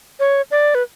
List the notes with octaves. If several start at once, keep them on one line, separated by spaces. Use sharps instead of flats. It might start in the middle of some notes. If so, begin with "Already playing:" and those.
C#5
D5
B4